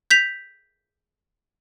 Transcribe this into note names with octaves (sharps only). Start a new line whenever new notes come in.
G6 B6 F7